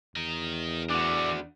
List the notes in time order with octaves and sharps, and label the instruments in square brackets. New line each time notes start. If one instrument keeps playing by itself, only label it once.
[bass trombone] E2 [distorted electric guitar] A#4 D#5
[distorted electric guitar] E3 A3 [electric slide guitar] D4 F#4 [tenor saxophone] D5